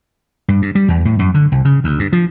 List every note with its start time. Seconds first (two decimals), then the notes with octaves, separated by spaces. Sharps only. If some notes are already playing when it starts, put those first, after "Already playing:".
0.48 G2
0.62 G2
0.75 G3
0.88 E2
1.05 A2
1.19 F#2
1.34 D3
1.52 C2
1.65 C#3
1.84 D2
1.99 G2
2.13 F3